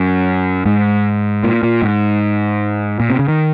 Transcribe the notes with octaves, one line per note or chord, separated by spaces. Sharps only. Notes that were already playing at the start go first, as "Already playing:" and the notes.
Already playing: F#2
G#2
A#2
A#2
G#2
A#2
C3
C#3
D#3